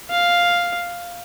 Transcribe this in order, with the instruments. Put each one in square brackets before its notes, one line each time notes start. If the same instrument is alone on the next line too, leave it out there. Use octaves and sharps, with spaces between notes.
[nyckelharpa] F5